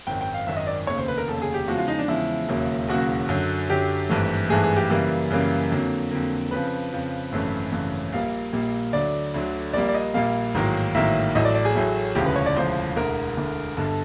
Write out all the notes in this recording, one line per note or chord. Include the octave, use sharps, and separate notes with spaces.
G#1 F#2 D#3 G5
G5
F5
G#1 F#2 D#3 E5
D#5
D5
F1 D#2 C#3 C#5
C5
B4
A#4
F1 D#2 C#3 A4
G#4
G4
E2 C#3 F3 G#3 F#4
F4
D#4
D4
E2 C#3 F3 G#3 E4
E1 D#2 C#3 F#3 A#3
E1 D#2 C#3 F#3 A#3 F#4
F#2 D3 F#3
F#2 D3 F#3 G4
G#1 G2 E3 A3
G#1 G2 E3 A3 G#4
G#4
G4
F#2 C#3 E3 G3 A#3
F#2 C#3 E3 G3 A#3
F2 D3 F#3 A#3
F2 D3 F#3 A#3
F2 C#3 F3 B4
F2 C#3 F3
G#1 F#2 C#3 E3 A3
G#1 F#2 C#3 E3 A3
A#1 A#2 G3 A#3 F5
A#1 A#2 G3 A#3
D2 D3 F#3 D5
D2 D3 F#3
A#1 A#2 G3 A#3 D5
D5
D#5
A#1 A#2 G3 A#3 F5
A1 G#2 D#3 F#3 A#3
A1 G#2 D#3 F#3 A#3 E5
A1 A2 F#3 A3 D#5
D5
D5
G#4
A1 A2 F#3 A3
E1 D2 C#3 F3 G4
B4
C#5
D5
E1 D2 C#3 F3 C5
E1 D2 D3 A#4
E1 D2 D3
G1 G2 D3 A4